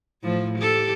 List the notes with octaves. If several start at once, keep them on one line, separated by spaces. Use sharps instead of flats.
A2 F3
G4 A4